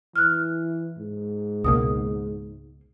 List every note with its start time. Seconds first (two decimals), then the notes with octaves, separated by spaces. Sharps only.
0.16 E3 F6 F#6
0.98 G#2
1.65 C#2 B2 A#3 D#6